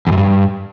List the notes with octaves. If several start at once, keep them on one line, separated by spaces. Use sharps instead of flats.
E2
F#2
G2